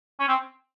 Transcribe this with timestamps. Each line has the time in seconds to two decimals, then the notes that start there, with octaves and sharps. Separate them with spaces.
0.20 C#4
0.28 C4